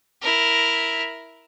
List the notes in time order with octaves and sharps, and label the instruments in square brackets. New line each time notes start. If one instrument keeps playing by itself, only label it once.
[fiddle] E4 A#4